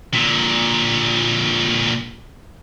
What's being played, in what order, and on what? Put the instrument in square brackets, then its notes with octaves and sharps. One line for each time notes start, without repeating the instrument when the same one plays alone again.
[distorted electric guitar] A#2 D3